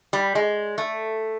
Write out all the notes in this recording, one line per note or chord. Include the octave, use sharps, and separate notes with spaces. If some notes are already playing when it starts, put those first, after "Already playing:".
G3
G#3
A3